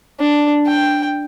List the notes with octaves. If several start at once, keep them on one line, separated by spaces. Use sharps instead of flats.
D4
G5